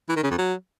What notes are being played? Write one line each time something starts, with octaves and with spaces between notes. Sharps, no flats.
E3
D#3
C#3
F2
F#3